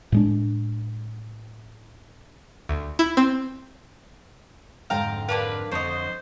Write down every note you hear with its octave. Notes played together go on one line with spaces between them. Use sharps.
A2 G#3 D4
D2
E4
C4
F2 G#2 D3 F5 G5 A#5
A#3 D4 B4 F5
F2 D3 C5 C#5 D#5